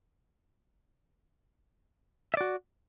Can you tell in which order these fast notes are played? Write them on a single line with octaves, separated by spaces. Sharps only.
E5 D5 F#4